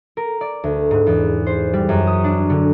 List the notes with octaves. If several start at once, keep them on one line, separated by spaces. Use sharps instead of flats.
A#4
D5
D2
G#2
E2
C5
G3
F#2
D#6
D4
D3